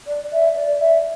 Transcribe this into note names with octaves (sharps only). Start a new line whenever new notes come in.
D5
E5
D5
E5